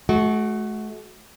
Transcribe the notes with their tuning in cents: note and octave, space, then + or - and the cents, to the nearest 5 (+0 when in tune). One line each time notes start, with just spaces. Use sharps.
A3 -45 F#4 +0